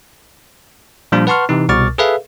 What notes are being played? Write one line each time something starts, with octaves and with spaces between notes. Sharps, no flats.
A#2 F3 G3 D4 F4
B4 F#5 A5 C6 C#6 F6
C3 E3 D#4
C2 B2 C#6 D6 F6 A6
G#4 A4 B4 E5 F5